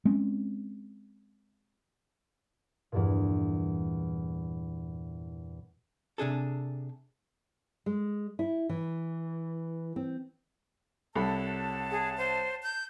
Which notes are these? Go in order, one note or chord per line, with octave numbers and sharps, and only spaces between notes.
G#3 C4 C#4
E2 G2 A#2
C3 D4 G#4 A4
G#3
E4
E3
C4
C2 A4 C#5 F#5 A5 B5
G#4
C5
G6